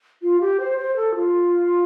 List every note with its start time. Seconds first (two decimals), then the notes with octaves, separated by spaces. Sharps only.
0.23 F4
0.41 G4
0.60 C5
0.78 C5
0.96 A4
1.15 F4